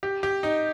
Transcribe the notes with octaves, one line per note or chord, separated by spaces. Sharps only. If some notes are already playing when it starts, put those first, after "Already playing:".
G4
G4
D#4